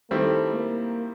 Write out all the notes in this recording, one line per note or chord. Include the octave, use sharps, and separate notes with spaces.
D#3 G3 A3 C4 E4
A#3